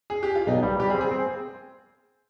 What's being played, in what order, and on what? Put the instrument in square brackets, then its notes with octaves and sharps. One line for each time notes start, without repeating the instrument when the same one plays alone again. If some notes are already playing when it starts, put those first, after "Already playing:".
[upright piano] G#4
G4
F4
[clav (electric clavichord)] B1 [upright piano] D#4
[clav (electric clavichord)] G3
[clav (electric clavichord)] G3 [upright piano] G4
[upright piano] G#4
[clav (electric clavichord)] C4
[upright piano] G#4
[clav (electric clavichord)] C4